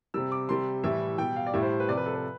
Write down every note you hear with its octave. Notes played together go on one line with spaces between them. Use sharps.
C3 G3 E6
D6
C3 G3 C6
A2 E3 G3 E5
B2 G3 G5
F5
D5
A2 G3 E5
C5
B4
C3 F3 B4 D5
A4
B4